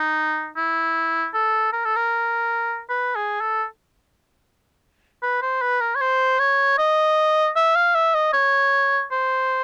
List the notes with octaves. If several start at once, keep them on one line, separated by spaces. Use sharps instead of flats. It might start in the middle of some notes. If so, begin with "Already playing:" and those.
Already playing: D#4
E4
A4
A#4
A4
A#4
B4
G#4
A4
B4
C5
B4
A#4
C#5
C5
C#5
D#5
E5
F5
E5
D#5
C#5
C5